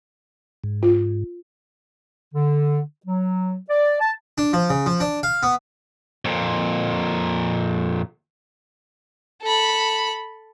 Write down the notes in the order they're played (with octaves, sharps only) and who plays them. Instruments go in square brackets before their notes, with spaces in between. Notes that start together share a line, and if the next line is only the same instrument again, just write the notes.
[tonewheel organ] G#2
[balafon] F4
[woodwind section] D3
F#3
D5
A5
[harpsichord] D4
F3
C#3
F3
D4
F5
B3
[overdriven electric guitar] F2 A#2
[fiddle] A4 B5